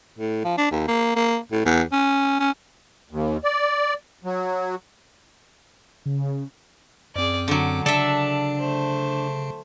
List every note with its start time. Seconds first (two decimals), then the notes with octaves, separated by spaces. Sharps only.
0.18 A2
0.44 F3
0.58 D4
0.71 D#2
0.87 A#3
1.16 A#3
1.52 A2
1.65 E2
1.92 C#4
2.40 C#4
3.11 D#2
3.44 D5
4.24 F#3
6.06 C#3
7.16 F#2 C4 G#4 D5
7.48 D3 F#3 D6
7.86 C#3 D4 A4 E5 A5
8.60 A3 C5